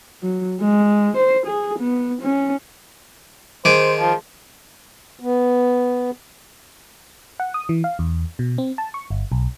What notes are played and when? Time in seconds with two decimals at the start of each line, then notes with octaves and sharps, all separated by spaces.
0.23 F#3
0.60 G#3
1.17 C5
1.46 G#4
1.79 B3
2.21 C#4
3.65 D#3 G#3 C5 D6
3.99 F3
5.19 B3
7.40 F#5
7.54 D#6
7.69 E3
7.84 F5
7.99 E2
8.39 B2
8.58 C4
8.78 A5
8.94 C#6
9.10 G1
9.32 B1